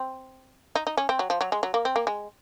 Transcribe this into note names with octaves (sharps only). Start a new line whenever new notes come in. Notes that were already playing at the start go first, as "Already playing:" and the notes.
Already playing: C4
D#4
D#4
C#4
C4
F#3
F3
F#3
G#3
F#3
A#3
C4
A#3
G#3